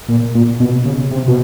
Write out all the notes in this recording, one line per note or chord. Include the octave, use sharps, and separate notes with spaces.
A#2
A#2
B2
C#3
C3
B2